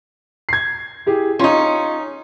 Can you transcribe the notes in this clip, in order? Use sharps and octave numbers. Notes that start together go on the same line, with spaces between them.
G#6 C7
E4 G4 G#4
C#4 D#4 F4 C#5 C6